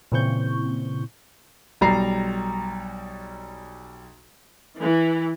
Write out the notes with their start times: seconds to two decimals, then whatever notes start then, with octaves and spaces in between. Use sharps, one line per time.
0.12 A#2 C#3 E3 C4 C#6 G6
1.81 B1 G3 A#5 C7
4.78 E3